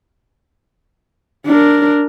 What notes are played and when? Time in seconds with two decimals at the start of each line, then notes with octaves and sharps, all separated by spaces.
1.47 D4 A#4